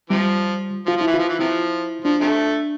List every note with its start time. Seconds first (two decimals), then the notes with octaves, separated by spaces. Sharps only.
0.10 C3 F3 G3
0.86 F3 F4
0.97 F3
1.01 E4
1.07 E3
1.14 F3 F4
1.29 E3
1.39 C3 F3 E4
2.04 F3 D4
2.21 C3 F3 A3